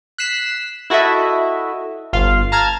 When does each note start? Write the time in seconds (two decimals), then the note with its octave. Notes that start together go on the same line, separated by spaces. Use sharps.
0.18 F#6 B6 C7 E7
0.90 E4 F#4 A4 D#5 E5
2.13 G1 F4 F5
2.52 A5 A#5 F6 G#6